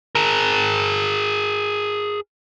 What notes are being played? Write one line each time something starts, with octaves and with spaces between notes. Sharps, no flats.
G#4 A#4